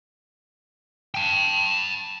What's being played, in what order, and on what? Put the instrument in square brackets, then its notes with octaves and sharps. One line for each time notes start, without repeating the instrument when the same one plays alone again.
[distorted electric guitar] G5 A5